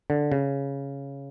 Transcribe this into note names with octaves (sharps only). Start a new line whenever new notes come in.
D3
C#3